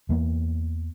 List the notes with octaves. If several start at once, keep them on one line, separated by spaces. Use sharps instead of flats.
E2 E3 A#3 B3